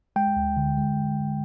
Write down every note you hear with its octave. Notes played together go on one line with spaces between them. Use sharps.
G#3 G5
D2
D3
G#3